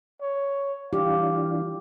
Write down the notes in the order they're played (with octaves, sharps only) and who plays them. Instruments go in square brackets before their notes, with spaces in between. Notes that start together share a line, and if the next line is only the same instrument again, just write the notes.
[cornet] C#5
[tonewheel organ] E3 D4 F4 [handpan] G4 [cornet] F5 [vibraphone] D6